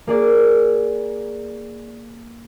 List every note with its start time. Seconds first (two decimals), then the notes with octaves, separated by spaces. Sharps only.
0.07 A#3 G#4 D5